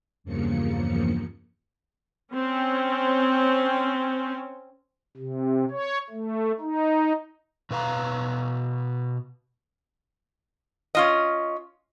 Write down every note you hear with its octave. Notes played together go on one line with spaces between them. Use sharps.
E2 G2 C#3 F3 A#3 C#7
C4 C#4
C3
C#5
A3
D#4
B2 B4 F5 A#5
C#4 F4 D#5